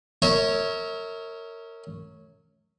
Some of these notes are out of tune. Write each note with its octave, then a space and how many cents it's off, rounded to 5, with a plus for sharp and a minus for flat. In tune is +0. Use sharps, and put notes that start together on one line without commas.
A#4 -25 C#5 -5 E5 -40